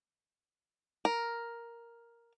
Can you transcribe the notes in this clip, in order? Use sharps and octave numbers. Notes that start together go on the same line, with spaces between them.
A#4